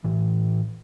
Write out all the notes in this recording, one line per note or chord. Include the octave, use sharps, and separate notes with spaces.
A2 E3